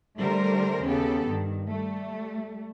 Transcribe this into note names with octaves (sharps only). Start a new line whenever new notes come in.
D3 G3 A3 A#4 C5
D#2 C#3 B3 G4 A4
G2 D#3
G3 A3